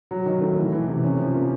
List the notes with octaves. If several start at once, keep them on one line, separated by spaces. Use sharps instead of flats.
F#3
D#3
A3
E3
E3
C3
C#4
F3
A#3